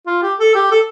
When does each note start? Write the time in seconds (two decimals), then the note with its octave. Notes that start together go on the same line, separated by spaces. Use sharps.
0.07 F4
0.22 G4
0.39 A4
0.55 G4
0.71 A4